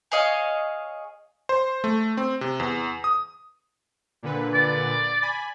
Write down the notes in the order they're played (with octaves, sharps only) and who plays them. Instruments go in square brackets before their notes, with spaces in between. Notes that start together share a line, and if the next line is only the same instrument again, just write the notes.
[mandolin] G#4 C#5 D#5 F5
[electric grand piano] C5
A3
C4
C3
E2
D#6
[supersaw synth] A#2 D3 B4
[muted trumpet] D5
[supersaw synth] G#5 B5